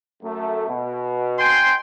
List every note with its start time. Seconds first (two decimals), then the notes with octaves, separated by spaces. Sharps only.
0.23 F#2 A3
0.68 B2
1.38 G5 G#5 C6